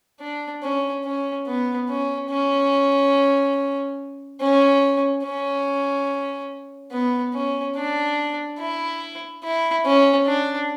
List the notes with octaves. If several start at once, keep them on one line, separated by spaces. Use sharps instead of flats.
D4
C#4
C#4
B3
C#4
C#4
C#4
C#4
B3
C#4
D4
E4
E4
C#4
D4